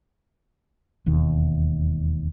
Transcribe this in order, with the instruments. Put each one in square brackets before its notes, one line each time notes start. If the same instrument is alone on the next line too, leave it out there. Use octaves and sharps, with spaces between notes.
[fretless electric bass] E1 D#2